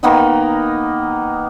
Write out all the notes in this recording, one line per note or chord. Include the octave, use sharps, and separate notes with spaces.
D#3 A#3 B3 D#4